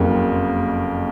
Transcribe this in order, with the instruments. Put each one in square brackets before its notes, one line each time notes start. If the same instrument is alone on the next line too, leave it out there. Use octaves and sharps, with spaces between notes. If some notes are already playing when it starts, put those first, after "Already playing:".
Already playing: [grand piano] F#1 F2 C#3 F#3 A#3